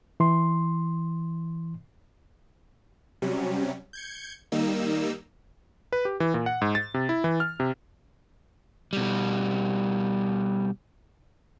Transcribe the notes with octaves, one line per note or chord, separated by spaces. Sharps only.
E3 C6
C3 F#3 G3 C#4
G6 G#6 C#7
D#3 G3 A#3 D#4 E6
B4
G4
E3
A#2
F#5
G#2
A6
C3
E4
E3
F6
C3
B2 G3